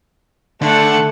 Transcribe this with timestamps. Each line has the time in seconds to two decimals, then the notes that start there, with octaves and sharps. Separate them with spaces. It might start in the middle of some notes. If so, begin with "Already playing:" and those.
0.61 D3 A3 F#5